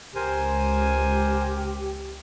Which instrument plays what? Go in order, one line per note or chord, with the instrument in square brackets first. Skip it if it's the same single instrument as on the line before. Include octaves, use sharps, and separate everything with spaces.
[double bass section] C#2 [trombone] G4 [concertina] A#4 C5 G#5